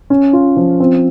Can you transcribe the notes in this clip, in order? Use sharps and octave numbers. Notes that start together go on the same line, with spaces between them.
C#4
F4
F3
C4